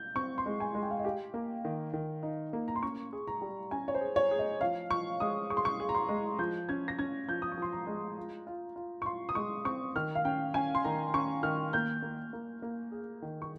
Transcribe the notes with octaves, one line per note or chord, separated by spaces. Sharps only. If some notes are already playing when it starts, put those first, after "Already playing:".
Already playing: G6
C4 C#6
C6
G#3
G#5
G#3
G5
F5
D#5
G4 F5
A#3
D#3
D#3
D#4
A#3
A#5
C6
C#4 C#6
G#4
A#5
G3
C#4 G#5
C#5
C5
G#4
C#5
G#4
D#5
F3 F5
F3 C#6
G#3 D#6
G#4 C#6
C6
C#6
G#4
A#5
C6
G#3
F3 G6
C#4 G#6
A#6
C#4 G#6
F3 G6
D#6
C#6
F3 C6
A#5
G#3
F4
F4
F4
C#6
F4 C6
D#6
G#3 C#6
C4 C#6
D#3 F6
F5
C#4 G5
C#4 G#5
C6
D#3 A#5
C#4 C#6
D#3 F6
A#3 G6
A#3
A#3
A#3
G#4
D#3
C#6